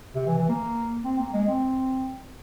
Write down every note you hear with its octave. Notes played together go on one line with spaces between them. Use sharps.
C3
E3
E3
A#3
C4
A#3
G#3
C4